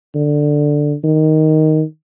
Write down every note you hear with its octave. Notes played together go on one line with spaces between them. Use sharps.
D3
D#3